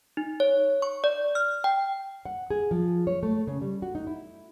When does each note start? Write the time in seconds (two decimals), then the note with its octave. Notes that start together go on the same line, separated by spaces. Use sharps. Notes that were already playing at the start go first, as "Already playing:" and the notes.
0.17 D#4
0.40 C#5
0.82 C#6
1.04 D5
1.35 F6
1.64 G5
2.25 F#5
2.50 G#4
2.71 F3
3.07 C#5
3.23 A3
3.47 C#3
3.62 G3
3.82 F#4
3.95 D#4
4.07 E4